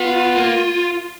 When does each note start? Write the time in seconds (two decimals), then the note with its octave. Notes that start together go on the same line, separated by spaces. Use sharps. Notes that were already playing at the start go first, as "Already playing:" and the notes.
Already playing: B3 F4
0.36 A#3